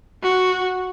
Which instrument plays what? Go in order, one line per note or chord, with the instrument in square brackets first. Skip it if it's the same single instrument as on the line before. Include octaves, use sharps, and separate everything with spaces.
[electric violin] F#4